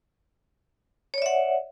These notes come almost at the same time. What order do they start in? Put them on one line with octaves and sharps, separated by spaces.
C#5 D5 E5 F#5